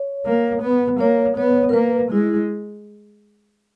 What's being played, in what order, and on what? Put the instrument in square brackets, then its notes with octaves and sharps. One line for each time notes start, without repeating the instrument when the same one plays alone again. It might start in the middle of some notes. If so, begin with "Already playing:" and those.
Already playing: [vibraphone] C#5
[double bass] A#3
B3
[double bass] A#3 [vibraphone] C#5
[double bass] B3 [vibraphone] C#5
[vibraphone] A#4
[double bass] A#3 [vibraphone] B4
[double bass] G#3 [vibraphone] E4